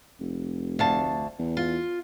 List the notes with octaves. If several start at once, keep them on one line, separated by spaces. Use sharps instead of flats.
F1
D2 F5 A5
E2
F4